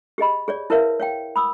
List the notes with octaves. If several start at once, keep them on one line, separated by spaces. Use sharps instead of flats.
G4 G#4 D#5 B5
G#4 C#5 D5
E4 A#4 B4 C#5 E5 F5
C#5 F5 G5
B5 D#6 E6